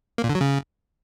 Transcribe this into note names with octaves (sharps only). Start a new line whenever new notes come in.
A#3
A#2
D3
F#3
C#3